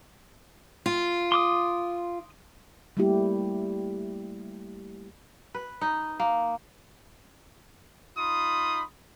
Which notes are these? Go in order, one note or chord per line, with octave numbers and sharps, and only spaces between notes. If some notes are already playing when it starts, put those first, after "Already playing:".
F4
C6 D6 D#6
G3 A3 A#3 E4 G4
B4
D#4
A#3
D#4 F4 B5 C6 D#6